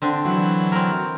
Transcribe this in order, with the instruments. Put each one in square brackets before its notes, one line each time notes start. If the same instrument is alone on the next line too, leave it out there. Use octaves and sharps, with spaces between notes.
[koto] D3 C4 D4
[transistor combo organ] E3 F#3
[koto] C4 A#4